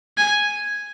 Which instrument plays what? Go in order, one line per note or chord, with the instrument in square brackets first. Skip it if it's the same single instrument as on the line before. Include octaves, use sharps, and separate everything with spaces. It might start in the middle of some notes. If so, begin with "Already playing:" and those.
[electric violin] G#5